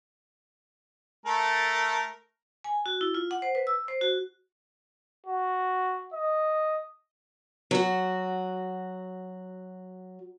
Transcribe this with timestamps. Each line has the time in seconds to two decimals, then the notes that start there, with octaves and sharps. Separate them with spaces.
1.26 A3 A4 A#4
2.64 G#5
2.86 F#4
3.01 E4
3.14 F4
3.31 F#5
3.42 C5
3.55 B4
3.67 E6
3.88 C5
4.01 F#4
5.26 F#4
6.13 D#5
7.71 F#3 F#4